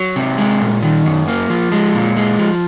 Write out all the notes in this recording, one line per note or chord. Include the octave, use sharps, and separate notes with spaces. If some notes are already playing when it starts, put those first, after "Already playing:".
Already playing: F#3
C3
G#3
A#2
D#3
F#2
A#3
F3
G#3
A#2
G#3
F3